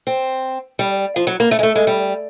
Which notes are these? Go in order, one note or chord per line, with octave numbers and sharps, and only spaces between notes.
C4
G3
F3
F#3
A#3
A3
G#3
A3
G#3
G3